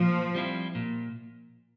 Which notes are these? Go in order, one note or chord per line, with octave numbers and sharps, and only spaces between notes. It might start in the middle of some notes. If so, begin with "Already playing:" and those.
Already playing: A#2 F3
G3 C4 E4
A#2